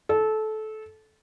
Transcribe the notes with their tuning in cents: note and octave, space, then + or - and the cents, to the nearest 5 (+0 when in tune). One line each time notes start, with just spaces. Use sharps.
A4 -20